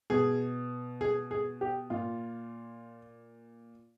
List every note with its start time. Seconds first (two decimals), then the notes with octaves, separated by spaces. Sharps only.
0.10 B2 G#4
1.01 G#4
1.31 G#4
1.61 G4
1.90 A#2 F4